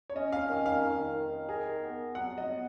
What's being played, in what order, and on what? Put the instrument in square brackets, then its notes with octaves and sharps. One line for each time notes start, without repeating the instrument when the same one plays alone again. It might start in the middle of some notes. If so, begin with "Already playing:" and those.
[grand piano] C#5
[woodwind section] C#4 [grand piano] D#5
[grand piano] F5
[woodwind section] D#3
[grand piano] F5
[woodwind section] D#3
D#3
[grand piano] G#4 [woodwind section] A#4
[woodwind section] B3
[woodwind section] F#3 [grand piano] F#5
[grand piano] D#5
[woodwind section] B3